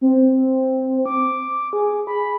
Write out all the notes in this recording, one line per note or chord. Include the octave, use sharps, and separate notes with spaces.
C4
D6
G#4
B5